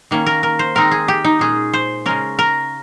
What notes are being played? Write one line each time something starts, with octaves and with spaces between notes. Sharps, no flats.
D#3 A#3 C#4
A#4
A#4
C5
D#3 G#3 C4 D#4 A#4
G#4
G4
D#4
A#2 G#3 C#4 G#4
C5
C#3 G#3 C#4 A#4
A#4